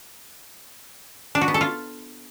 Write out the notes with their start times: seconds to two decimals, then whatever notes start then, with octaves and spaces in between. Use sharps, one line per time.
1.35 D4
1.41 F#4
1.48 B3
1.54 A4
1.61 F4